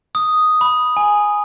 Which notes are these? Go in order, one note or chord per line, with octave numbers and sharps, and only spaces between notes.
D#6
B5
G#5